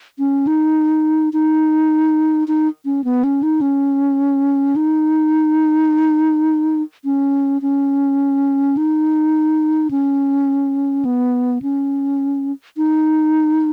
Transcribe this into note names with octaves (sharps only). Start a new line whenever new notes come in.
C#4
D#4
D#4
D#4
C#4
B3
C#4
D#4
C#4
D#4
C#4
C#4
D#4
C#4
B3
C#4
D#4